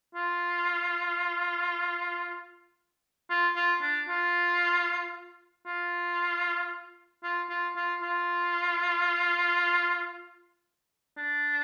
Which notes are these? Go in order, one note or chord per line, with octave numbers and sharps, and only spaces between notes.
F4
F4
F4
D4
F4
F4
F4
F4
F4
F4
D4